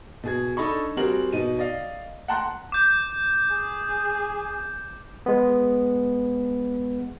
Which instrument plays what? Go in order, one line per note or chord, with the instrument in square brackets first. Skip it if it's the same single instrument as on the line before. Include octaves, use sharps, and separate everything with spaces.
[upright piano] B2 G#4 G#6
D4 D#4 A4 D#5 B5 C#6
G3 C4 F#4 G#4 A#4 F#7
B2 D#4 D#7
D5 D#5 F5
F#5 G5 A5 A#5 C6 F#6
[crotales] D6 G6
[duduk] G#4
[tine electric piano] G#3 B3